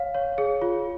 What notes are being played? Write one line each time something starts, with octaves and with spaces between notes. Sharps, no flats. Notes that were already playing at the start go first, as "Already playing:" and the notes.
Already playing: C#5 F5
C#5
G#4
F4